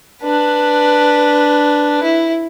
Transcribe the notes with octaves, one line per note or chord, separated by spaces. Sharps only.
D4 B4
E4